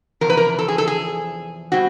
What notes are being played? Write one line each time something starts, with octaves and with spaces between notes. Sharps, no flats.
E2 C3 F3 A#4
B4
A#4
A4
G#4
A4
G#4
B2 G3 C4 F#4